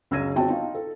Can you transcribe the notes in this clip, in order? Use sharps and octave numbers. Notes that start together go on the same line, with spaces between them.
C#2 F#2 E6 G#6 A#6 D#7
G1 C4 F#4 G5 A5
D#4 F4 F5
A4